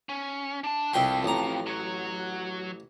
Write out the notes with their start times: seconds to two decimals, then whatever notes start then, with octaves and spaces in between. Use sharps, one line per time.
0.09 C#4
0.64 D4 A5
0.93 C2 F2 G5 C6
1.24 A1 A#5
1.66 F#3 C#5